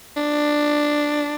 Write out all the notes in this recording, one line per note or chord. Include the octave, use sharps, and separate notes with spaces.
D4